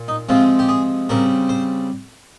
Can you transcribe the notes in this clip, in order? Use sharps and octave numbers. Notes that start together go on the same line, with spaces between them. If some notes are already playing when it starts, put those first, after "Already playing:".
Already playing: A#2
D#4
C3 F3 G#3 C4 F4
G4
G#4
C#3 G3 C4 A#4
C5